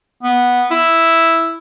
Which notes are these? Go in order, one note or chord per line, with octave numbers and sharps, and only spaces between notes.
B3
E4